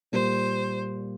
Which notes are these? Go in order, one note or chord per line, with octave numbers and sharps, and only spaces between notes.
A#2 G3 A#3 C5